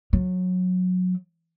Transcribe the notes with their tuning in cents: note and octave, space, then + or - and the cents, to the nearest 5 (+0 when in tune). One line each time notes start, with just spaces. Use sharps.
F#3 -20